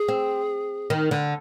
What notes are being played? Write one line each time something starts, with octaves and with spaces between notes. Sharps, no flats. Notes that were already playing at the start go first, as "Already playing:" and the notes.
Already playing: G#4
C4
D#3
D3